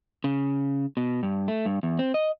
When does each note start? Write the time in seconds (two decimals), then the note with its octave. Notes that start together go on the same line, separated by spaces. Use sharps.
0.24 C#3
0.97 B2
1.23 G2
1.48 A3
1.66 G2
1.83 E2
1.99 C4
2.14 D#5